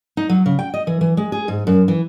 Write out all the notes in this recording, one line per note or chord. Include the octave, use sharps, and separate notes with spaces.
D#4
F#3
C#3
G5
D#5
E3
E3
G#3
G#4
G#2
F#2
E3